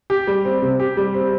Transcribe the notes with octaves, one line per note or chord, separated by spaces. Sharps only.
G4
G3
C4
C3
G4
G3
C4